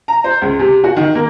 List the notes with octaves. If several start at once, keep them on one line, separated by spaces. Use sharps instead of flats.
A#5
C5
C#2
C3
F#4
D#3
A#3